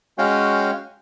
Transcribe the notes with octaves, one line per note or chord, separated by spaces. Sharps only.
G#3 C#4 F#4 C#5 F5 G5